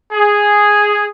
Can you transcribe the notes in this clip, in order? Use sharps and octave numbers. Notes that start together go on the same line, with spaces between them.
G#4